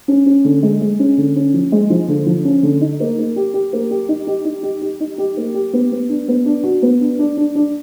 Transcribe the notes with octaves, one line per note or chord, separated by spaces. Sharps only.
C#4
C#4
D3
G#3
G#3
C#4
D3
C#4
F3
G#3
F3
D3
F3
C#4
D3
D#4
A#3
A#3
G4
G4
A#3
G4
D#4
G4
D#4
G4
G4
D#4
G4
A#3
G4
B3
B3
D4
B3
D4
F#4
B3
D4
D4
D4
D4